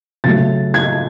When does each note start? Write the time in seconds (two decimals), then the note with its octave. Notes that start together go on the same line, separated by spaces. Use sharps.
0.24 C#3 F#3 A3 A6
0.74 G#6